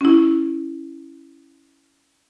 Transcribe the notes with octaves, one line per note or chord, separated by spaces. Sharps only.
C#4 E4